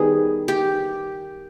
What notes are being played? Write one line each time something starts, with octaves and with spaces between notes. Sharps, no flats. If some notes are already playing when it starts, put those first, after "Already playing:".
Already playing: D#3 G3 B3 G#4
G4